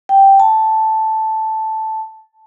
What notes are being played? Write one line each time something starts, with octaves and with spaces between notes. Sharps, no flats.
G5
A5